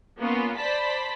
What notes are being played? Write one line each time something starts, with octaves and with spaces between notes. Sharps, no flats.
A#3 B3 C#4 F4
C5 D5 A5 B5 B6